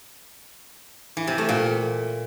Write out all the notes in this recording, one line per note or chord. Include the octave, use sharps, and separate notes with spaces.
E3
C3
A3
A#2